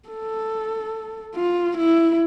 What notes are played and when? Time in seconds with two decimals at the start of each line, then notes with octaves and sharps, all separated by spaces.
0.09 A4
1.35 F4
1.77 E4